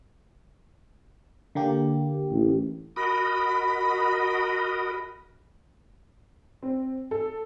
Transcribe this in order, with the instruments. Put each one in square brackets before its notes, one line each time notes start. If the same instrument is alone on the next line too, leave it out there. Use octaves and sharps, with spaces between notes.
[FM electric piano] D3 A#3 G4
[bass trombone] A1
[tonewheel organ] F#4 A#4 D#5 [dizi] B5
[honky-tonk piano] C4
A4